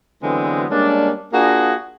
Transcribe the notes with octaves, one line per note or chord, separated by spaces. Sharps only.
D3 E3 F#3 G#3 B3 C4
G3 G#3 A#3 C#4 D4
A#3 D4 F4 F#4 G#4